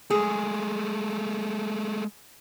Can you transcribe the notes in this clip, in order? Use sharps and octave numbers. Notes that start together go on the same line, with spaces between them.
G#3 A3 G#4